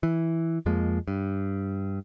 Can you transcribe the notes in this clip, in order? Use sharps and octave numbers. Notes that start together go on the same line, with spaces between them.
E3
F2 F3 G#3 A#3
G2